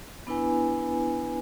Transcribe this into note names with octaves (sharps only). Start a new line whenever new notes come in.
B3 D4 E4 B4 G#5